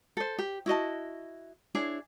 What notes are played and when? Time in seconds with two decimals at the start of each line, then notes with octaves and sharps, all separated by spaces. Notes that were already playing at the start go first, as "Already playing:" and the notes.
0.17 A4 C5
0.39 G4
0.66 E4 F#4 D#5 A5
1.75 D4 E4 G#4 C#5